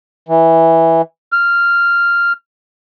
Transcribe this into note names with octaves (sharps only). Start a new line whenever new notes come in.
E3
F6